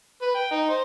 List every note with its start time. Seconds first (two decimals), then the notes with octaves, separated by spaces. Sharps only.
0.22 B4
0.35 G5
0.51 D#4
0.70 C5